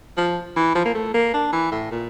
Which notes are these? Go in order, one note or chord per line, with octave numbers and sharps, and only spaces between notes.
F3
E3
F3
A#3
A3
A#3
D4
E3
A2
A#2